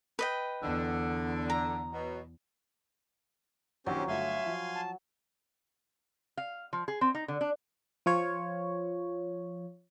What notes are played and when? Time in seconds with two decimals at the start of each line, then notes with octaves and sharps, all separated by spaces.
0.19 B4 D#5 G5
0.62 E2 D3
1.50 A#5
1.92 B2 F#3
3.86 A#1 D#3 F#3 C#4 G4 C5
4.08 G1 A3 F#4 E5 F5 G#5 C6
4.46 F3
4.74 A5
6.37 F5
6.73 F3
6.88 G#4
7.01 C4
7.15 D#4
7.28 D3
7.41 D4
8.06 F3 F4 C#5